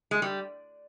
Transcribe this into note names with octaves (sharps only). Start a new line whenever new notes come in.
G#3
G3